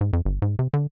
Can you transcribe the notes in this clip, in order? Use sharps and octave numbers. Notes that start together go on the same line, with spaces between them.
G#2
F2
G1
G#2
C3
D3